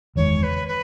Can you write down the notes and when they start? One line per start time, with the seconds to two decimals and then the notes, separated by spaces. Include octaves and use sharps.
0.16 F#1 E2 D#3 G#3 C#5
0.42 B4
0.67 B4